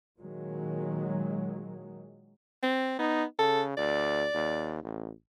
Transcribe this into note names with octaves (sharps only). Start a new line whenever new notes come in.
A#2 D#3 F#3 G#3
C4
B3 D#4
C#3 A4
D2 D5
D#2
A1